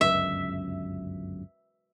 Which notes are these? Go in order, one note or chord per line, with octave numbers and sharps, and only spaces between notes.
G1 C#2 F#2 E5